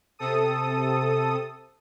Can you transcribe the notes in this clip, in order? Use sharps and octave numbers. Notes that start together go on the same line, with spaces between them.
C3 A4 D#6